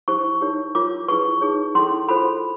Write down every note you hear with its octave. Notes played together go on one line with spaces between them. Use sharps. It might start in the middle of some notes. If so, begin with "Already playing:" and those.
E4 G4 C5 C#6
D#4 G4 A#4 C#5
F4 A#4 C#5 D6
E4 G#4 B4 C#6
D#4 G#4 C#5
C#4 E4 A4 C6
F4 A4 C5 B5